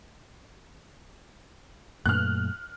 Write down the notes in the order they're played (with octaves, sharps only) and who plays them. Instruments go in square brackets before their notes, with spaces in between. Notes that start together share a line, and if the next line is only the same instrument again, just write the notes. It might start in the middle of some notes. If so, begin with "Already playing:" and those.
[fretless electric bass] F#2 A#2 A3 [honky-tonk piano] F6 F#6